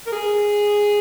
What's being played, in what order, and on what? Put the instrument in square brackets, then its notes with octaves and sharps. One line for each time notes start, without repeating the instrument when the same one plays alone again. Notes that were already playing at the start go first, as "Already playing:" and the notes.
[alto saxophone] A#4
G#4